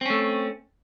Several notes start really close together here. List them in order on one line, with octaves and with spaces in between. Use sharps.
C4 C#4 A3